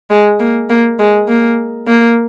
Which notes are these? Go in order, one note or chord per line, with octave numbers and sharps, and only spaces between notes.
G#3
A#3
A#3
G#3
A#3
A#3